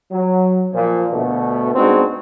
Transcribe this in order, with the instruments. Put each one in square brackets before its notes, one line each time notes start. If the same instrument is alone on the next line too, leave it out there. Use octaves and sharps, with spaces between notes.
[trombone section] F#3
A#2 F3
D2 B2 A3
G#3 B3 C4 D4 D#4 F#4